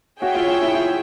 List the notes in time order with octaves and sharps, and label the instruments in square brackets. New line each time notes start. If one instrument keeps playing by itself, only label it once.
[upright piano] F#4 [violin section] G#4 C#5 E5 G5
[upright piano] F4
F4
E4
F4